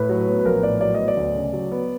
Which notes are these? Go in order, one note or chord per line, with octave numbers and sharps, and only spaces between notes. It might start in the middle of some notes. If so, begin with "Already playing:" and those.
Already playing: A2 B4
F#3
B3
B4
A#1 A#4
A2 D5
F#3 D5
B3 D#5
D5
D2
C#3
F#3
B3